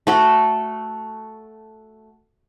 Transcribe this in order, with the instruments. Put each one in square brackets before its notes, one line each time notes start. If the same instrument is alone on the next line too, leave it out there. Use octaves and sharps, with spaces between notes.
[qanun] A3 F#4 A4